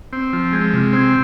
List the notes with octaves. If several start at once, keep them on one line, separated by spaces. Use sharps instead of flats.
C4
F3
G#3
C3
C4